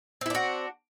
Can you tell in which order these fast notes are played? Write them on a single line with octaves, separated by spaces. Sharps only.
C4 E4 D4 F#4